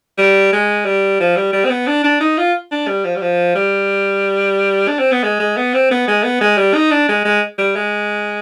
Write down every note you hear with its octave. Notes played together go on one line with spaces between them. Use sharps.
G3
G#3
G3
F3
G3
G3
C4
B3
D4
D4
D#4
F4
D4
G3
F3
G3
F3
G3
D4
C4
B3
G#3
G#3
B3
C4
B3
G#3
B3
G#3
G3
D#4
D4
G#3
G#3
G3
G#3